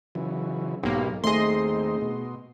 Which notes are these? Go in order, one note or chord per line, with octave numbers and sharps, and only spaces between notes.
C#3 E3 F#3
B1 G#2 A#3 D#4 G4
D#2 A3 C4 D#4 G#4 D#5 C6
B2